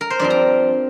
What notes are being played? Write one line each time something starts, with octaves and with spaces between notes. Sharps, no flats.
A#4
C5
G2 F3 C4 D5
A#5